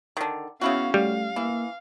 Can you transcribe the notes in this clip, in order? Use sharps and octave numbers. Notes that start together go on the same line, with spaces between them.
D3 D#3
C#3 B3 C#4 E4 F#4 F5
G3 A3 F5
E3 A#3